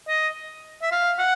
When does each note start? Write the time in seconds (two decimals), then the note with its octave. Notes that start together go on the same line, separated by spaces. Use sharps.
0.08 D#5
0.82 E5
0.91 F5
1.19 F#5